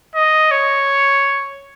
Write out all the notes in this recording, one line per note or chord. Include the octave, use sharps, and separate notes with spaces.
D#5
C#5